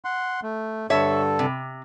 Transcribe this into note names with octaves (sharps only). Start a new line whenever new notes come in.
F#5 C6
A3
G2 D3 A4 C#5 E5
C3